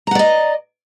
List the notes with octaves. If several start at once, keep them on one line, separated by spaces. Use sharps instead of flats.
D5 D#5 F#5 A#5